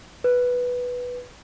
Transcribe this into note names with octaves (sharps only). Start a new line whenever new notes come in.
B4